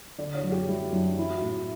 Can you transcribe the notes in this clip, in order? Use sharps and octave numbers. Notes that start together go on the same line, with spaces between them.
D3 D5
C#5
F#2 F#4
G4
G3 E4
F#2 D4
E3 E4
F#4
A2 E4